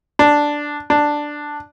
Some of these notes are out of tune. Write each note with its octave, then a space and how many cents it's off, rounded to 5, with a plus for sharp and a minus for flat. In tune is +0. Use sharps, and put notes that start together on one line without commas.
D4 +0
D4 +5